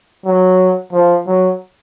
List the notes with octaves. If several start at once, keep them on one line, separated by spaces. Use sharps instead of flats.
F#3
F3
F#3